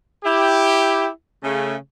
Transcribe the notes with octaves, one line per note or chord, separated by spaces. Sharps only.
E4 G4
C#3 A3